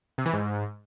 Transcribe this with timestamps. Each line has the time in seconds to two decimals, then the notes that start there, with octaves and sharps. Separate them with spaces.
0.18 C3
0.26 E3
0.33 G#2